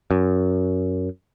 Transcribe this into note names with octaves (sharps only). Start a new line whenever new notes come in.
F#2